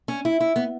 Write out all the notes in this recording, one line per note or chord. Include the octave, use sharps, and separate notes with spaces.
C#4
E4
E4
B3